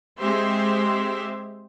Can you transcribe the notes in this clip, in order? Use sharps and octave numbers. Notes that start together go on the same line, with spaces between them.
G#3 C4 G4 C5 E5 C6